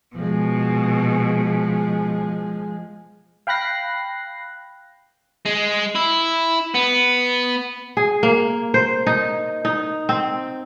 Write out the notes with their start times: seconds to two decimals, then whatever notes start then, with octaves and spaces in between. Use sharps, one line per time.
0.16 B2 F3 G#3
3.47 F5 G5 B5 F#6 A#6 C7
5.46 G#3
5.95 E4
6.74 B3
7.97 G#4
8.23 A#3
8.74 C5
9.07 D#4
9.65 D#4
10.09 C4